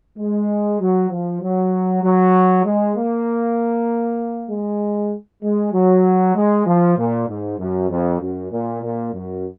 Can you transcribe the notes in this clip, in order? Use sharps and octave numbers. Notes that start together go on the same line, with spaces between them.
G#3
F#3
F3
F#3
F#3
G#3
A#3
G#3
G#3
F#3
G#3
F3
A#2
G#2
F#2
F2
F#2
A#2
A#2
F#2